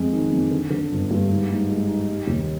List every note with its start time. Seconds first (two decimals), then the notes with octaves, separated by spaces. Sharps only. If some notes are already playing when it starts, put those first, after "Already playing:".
Already playing: F2 G#3
0.13 D#3
0.32 F2
0.51 D3
0.70 D3
0.91 G1
1.11 G2
1.30 G#2
1.50 G#2
1.69 G#3
1.89 D#4
2.08 G3
2.27 D#2